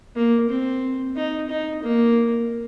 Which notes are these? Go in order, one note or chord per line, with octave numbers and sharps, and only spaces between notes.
A#3
C4
D#4
D#4
A#3